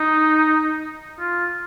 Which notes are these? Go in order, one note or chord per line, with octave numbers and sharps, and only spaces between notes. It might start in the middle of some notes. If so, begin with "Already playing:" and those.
Already playing: D#4
F4